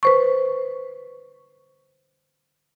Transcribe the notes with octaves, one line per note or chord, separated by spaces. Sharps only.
B4 C5 C#6